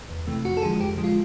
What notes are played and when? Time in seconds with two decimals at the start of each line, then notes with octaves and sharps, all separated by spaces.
0.10 E2
0.27 C3 E3 A3
0.45 F2 F#4
0.57 A4
0.62 D3 F3 G#3 G#4
0.80 F2 G4
0.97 D3 F3 G#3
1.04 F4